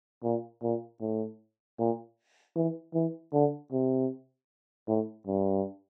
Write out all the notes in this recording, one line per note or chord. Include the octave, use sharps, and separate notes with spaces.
A#2
A#2
A2
A#2
E3
E3
D3
C3
A2
G2